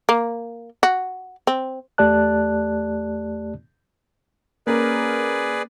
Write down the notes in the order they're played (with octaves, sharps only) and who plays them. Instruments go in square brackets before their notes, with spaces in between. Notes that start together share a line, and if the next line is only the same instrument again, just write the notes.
[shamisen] A#3
F#4
C4
[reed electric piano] E2 A3 G4 D5 A5 F#6
[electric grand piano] A#3 C#4 A#4 [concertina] G#4 B4 D5